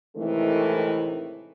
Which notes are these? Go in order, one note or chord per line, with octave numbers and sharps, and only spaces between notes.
A2 C3 D#3 E3 G#3 A3